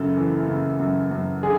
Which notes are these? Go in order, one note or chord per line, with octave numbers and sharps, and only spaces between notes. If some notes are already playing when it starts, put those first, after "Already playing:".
Already playing: F#2 C#3 A4
E3
C#3
F#2
F#2
D3 G#4